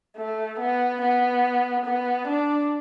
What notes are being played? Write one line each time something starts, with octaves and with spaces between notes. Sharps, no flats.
A3
B3
B3
B3
D4